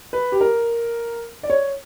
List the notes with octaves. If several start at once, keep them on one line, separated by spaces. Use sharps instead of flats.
B4
G4
A#4
D5
C#5